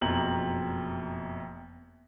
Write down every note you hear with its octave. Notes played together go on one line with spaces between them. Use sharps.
F#1 F2 B2 A#5 F#7